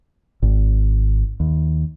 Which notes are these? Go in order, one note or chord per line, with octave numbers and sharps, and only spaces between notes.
G#1
D#2